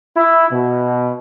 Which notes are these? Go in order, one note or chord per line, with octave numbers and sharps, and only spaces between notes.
E4
B2